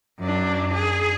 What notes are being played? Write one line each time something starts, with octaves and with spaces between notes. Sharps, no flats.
F#2 D4
G#4